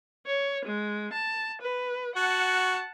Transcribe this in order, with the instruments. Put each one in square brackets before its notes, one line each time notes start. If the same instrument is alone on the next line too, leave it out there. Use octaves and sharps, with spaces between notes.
[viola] C#5
G#3
A5
B4
[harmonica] F#4 [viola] F#5 A5